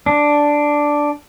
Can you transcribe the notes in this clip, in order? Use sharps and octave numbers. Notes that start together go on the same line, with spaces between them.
D4